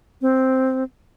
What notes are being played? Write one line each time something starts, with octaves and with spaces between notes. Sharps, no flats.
C4